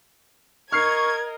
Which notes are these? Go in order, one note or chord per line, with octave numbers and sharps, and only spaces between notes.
A#4 D#5 C#6 F6 G#6 C7